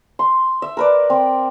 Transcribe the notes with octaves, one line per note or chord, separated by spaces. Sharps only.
C6
E5
A#4 B4 D5
C4